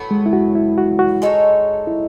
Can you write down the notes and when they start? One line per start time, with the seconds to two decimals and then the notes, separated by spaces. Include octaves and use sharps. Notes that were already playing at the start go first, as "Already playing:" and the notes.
Already playing: A2 F#3 B3
0.11 G#3
0.26 E4
0.33 F#4
0.55 E4
0.78 F#4
0.99 F#4
1.22 G#3 D#4 A4 C#5
1.87 E4